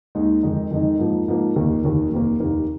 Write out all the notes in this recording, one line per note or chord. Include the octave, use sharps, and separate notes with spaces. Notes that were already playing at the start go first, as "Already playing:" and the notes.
D#2 D#3 G#3 D#4
F2 D#3 G#3 D#4
F2 D#3 G#3 D#4
G#2 F3 A#3
G#2 F3 A#3
F1 D#2 D#3 A#3
F1 D#2 D#3 A#3
F1 D#2 D#3 A#3
F1 D#2 D#3 A#3